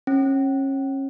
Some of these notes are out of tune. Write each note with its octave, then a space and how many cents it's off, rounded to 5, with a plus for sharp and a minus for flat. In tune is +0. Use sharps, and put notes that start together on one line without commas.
C#4 -30